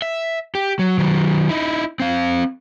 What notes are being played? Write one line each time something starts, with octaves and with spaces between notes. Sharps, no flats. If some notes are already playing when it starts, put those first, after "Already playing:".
E5
G4
F#3
D#3 F#3
D#4 E4
C4 F5